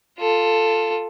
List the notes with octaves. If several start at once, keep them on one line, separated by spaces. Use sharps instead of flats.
F4 A4